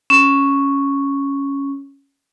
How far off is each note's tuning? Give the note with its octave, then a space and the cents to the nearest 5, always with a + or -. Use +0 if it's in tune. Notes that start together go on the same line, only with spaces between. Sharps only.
C#4 +0